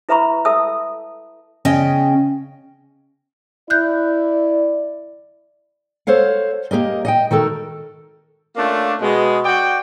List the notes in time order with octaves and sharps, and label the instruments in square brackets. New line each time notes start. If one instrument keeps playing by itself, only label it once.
[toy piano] E4 B4 E5 A#5 B5 C#6
A4 E5 A5 D#6 E6
[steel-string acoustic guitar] C#3 C#4 D#5 G5
[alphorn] E4 [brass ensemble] D5 [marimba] F#6 G6
[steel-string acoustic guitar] A4 C5 C#5 F5 F#5
A#3 G4 A#4 D#5
D#5 F#5 G5
D#3 F#4 A4 A#4
[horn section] A3 A#3 C#4 D4 F4
B2 G#3
F#4 D5 G5